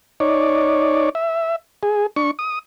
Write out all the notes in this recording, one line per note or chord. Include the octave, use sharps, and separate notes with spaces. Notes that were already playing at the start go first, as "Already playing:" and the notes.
D#4 C#5 D5
E5
G#4
D4 C#6
D#6